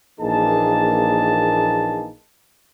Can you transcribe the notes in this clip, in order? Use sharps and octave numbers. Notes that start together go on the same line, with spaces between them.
A#1 E3 A#3 D#4 G#4 A5